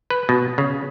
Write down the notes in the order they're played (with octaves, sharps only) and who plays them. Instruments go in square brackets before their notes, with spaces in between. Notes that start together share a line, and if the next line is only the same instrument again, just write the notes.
[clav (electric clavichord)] B4
B2
C#3